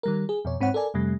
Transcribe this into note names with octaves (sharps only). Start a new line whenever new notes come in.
D#3 G3 A#4
G#4
F2 B2 C#5
G#2 C4 C#5 F#5
A4 A#4 D5 G#5
F2 C3 G3 A3